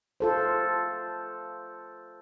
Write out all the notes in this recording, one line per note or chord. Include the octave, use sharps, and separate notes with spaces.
F4 A4 C5